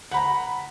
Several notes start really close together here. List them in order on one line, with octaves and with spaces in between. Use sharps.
F#5 B5 A#5